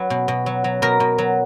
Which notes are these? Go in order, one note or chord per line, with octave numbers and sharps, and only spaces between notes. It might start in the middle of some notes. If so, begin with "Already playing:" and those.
Already playing: F#3 B4
B2
B2
F#3
F#3
B2 A#4
B2
F#3